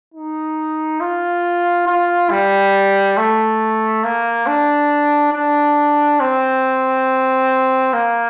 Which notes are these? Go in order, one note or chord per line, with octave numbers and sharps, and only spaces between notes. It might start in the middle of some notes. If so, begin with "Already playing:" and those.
D#4
F4
F4
G3
A3
A#3
D4
D4
C4
A#3